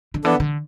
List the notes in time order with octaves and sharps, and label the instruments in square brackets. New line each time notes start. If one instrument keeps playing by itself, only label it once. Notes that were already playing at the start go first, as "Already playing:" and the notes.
[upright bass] D3
[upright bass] E3 [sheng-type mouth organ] B3 D4 A4
[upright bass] D3